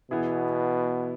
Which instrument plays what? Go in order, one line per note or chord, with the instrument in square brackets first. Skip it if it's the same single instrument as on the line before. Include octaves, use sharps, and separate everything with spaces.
[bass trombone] B2 [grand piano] E3 B3 E4 G#4